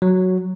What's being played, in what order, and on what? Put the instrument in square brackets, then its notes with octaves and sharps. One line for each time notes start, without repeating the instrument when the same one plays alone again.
[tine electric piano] F#3